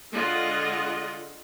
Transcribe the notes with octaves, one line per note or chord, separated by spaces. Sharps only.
D3 G#3 F4 D#5 F#5